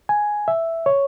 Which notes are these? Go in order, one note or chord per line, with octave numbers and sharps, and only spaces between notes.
G#5
E5
C#5